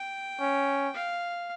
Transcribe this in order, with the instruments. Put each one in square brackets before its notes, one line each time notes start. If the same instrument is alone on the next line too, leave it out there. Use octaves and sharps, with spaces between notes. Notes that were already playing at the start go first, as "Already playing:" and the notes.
Already playing: [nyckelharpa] G5
[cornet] C#4
[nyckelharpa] F5